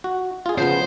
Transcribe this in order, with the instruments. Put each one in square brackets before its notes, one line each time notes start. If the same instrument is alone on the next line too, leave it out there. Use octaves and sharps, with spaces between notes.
[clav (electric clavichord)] F#4
F4 G#4
[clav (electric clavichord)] C#3 F3 B3 [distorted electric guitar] C5